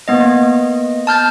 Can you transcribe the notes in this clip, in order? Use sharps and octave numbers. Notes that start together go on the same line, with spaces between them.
A#3 B3 D#5
A5 F6 G6 A6